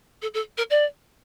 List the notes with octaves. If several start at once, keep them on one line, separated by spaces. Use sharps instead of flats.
A4
A4
A#4
D5